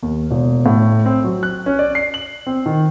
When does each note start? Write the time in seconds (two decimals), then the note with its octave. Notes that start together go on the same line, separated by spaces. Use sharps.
0.03 D#2
0.31 E1
0.66 A2
1.06 C4
1.24 F#3
1.43 F#6
1.66 C#4
1.79 D5
1.95 C7
2.14 F#7
2.47 C4
2.66 D#3